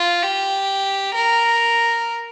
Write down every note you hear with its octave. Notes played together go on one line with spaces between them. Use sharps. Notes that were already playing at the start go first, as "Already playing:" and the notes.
Already playing: F4
G4
A#4